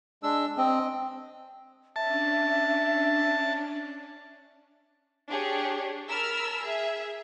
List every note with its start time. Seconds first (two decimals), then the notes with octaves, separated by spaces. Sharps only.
0.23 G#3 D4 E6
0.57 C4 D#5
1.96 C#4 D4 E5 A5
5.29 D4 G4 G#4 C#5
6.08 A#4 A5 B5 E6 F6
6.61 G#4 E5